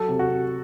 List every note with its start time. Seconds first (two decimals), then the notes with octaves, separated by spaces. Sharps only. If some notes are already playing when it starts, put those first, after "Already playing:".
Already playing: F#3 A4
0.08 C3
0.19 F#4
0.29 C3